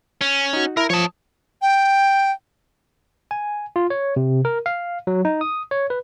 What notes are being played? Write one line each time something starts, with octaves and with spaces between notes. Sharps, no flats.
C#4
D#4 F#4
E4 A#4
F3 C#5 A5 D#6
G5
G#5
F4
C#5
C3
A#4
F5
F#3
D#4
D#6
C#5
B4